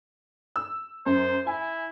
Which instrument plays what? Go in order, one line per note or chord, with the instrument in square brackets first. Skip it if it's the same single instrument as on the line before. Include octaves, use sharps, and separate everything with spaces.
[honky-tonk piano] E6
[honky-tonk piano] F#2 [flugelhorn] C5
[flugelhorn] E4 [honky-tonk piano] G#5